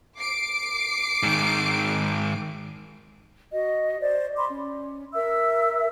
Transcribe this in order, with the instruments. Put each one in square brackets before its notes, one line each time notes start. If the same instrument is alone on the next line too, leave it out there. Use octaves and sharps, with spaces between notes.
[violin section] D6 C7 D7
[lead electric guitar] G#2 D#3
[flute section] F#4 D#5
C5 D5
B5 C6 D6
C#4
A#4 E5 E6